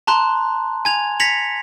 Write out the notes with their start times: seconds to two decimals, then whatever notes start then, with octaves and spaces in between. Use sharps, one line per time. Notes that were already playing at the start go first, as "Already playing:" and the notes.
0.07 A5 A#5 C6 F#6
0.85 G#5 G#6 F7
1.20 G#6 A#6 B6 C#7 F7 F#7